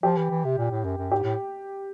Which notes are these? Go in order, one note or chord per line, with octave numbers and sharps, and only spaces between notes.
F3 G4
E3
E3
C3
A#2
A2
F#2
F#2
G#2 G4
A2